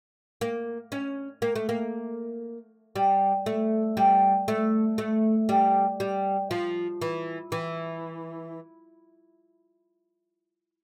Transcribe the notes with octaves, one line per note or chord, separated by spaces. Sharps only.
A#3
C#4
A#3
A3
A#3
G3
A3
G3
A3
A3
G3
G3
F3
E3
E3